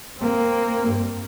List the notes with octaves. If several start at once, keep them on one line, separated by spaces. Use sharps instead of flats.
A#3 C4
G2